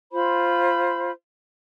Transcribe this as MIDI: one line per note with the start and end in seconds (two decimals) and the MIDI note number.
0.11 1.11 65
0.11 1.11 72
0.11 1.11 83